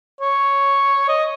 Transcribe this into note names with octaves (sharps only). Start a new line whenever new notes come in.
C#5
D#5